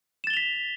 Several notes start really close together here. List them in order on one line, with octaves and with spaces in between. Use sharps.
E7 A6 G7 F7 B6